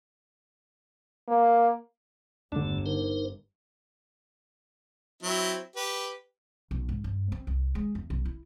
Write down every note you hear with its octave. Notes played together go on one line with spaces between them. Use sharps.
A#3
G1 E2 D3 A3 D4
D#4 A#4 C5
F#3 C4 E4
G4 B4
B1
G#2
G2
C4
C2
G#3
E2
B1
E4